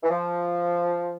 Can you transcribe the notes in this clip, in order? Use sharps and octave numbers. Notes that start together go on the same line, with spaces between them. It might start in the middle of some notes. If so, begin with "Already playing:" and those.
E3
F3